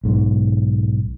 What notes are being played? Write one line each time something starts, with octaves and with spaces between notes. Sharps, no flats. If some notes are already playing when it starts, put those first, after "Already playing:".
B1 G#2